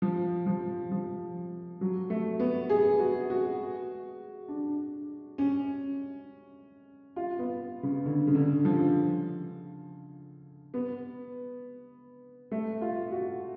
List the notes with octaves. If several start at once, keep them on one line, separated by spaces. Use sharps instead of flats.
F3
F3
F3
F#3
A3
B3
G#4
F#4
F#4
D4
C#4
F4
B3
C#3
D3
C#3
D3
F3
B3
A3
F4
F#4